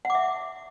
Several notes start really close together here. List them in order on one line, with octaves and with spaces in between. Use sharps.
F#5 D6 E5